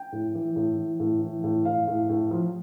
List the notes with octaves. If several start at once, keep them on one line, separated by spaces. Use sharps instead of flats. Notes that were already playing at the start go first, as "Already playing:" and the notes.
Already playing: G5
A2
E3
A2
E3
A2
E3
A2
A2 F5
A2
A2
F3